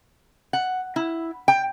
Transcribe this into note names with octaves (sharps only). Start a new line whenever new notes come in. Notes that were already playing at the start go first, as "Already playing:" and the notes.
F#5
E4
G5